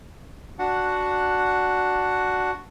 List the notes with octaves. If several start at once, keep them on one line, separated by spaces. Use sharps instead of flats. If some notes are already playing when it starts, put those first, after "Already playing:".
D4 F#4 F#5